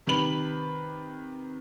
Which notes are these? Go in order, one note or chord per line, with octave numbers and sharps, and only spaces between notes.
C3 D#3 G4 B4 B5 F#7